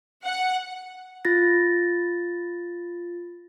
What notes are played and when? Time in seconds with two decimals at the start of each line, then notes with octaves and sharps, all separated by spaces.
0.25 F#5
1.25 F4 A6 A#6